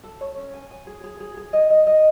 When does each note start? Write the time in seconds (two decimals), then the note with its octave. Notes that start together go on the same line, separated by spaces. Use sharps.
0.04 A4
0.21 C#5
0.37 C#4
0.54 G#5
0.71 G#5
0.87 G#4
1.04 G#4
1.20 G#4
1.37 G#4
1.53 D#5
1.70 D#5
1.87 D#5